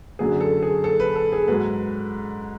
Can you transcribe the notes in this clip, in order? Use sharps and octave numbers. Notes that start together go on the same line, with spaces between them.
F#2 D3 F#3 G#4
A4
G#4
A4
B4
A4
G#4
G#2 F#3 B4